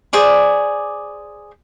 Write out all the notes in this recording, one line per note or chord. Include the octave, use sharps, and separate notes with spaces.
G#4 C5 D5 D6